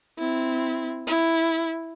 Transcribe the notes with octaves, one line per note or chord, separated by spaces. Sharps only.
C4 E4
E4